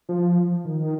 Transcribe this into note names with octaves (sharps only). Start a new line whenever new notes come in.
F3
D#3